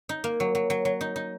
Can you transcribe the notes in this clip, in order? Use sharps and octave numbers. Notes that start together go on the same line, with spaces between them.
D#4
A#3
F#3
F#3
F#3
F#3
D#4
D#4